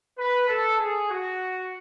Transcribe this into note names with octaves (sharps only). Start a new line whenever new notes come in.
B4
A4
G#4
F#4